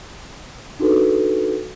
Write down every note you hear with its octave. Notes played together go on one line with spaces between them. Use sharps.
D4 D#4 F#4 G#4 A4 B4